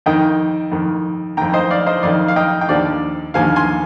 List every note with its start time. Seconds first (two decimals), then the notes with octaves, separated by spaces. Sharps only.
0.06 F2 D#3 D#5 G5
0.72 F2 D#3
1.37 F2 D#3 G5 A#5
1.54 C5 D#5
1.71 D5 F5
1.87 C5 D#5
2.03 F2 D#3 D5 F5
2.28 F5
2.36 D#5 G5
2.61 G5
2.69 D#2 D3 F3 D5 F5
3.34 D#2 D3 F3 F5 G#5
3.56 G#5 C6